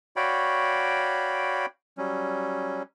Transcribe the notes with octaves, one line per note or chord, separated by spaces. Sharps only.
F#4 C#5 D5 F5 G5 B5
F#3 G3 C#4